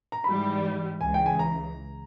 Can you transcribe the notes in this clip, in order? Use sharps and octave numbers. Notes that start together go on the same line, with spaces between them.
A#5
G#2 E3 G3 B5
C#2 C#3 E3 G#5
G5
G#5
A#5